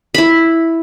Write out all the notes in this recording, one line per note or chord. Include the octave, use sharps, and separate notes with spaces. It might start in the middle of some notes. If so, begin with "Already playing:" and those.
E4 B5